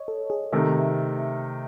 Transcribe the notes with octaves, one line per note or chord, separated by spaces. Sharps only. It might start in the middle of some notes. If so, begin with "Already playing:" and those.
Already playing: C#5 D#5
A4
G#4
C3 D#3 A3 E5